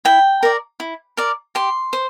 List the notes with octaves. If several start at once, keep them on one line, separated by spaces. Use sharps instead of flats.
E4 G5
A#4 D5
E4
A#4 D5
G4 C6
C5